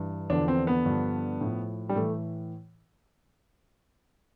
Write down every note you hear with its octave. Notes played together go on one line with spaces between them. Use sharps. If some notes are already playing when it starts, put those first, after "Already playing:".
Already playing: G2 E3
E2 D3 F3 D4
C4
B3
G2 D3 F3
A2 F3
G3
A2 E3 A3